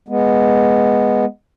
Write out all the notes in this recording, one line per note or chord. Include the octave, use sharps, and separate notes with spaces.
G#3 B3